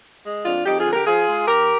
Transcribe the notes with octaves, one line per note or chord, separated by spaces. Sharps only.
G#3
F2 D4 F4
F2 D#4 G4
F4 G#4
D3
G4 A#4
F3 F4 G#4
G#3
D#2 G4 A#4